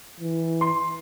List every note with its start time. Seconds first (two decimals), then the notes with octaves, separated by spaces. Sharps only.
0.20 E3
0.61 C6